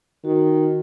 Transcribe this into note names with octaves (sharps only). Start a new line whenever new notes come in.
D#3 F#4